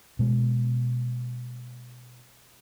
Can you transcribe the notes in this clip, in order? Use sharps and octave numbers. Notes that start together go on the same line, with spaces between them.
B2 G#3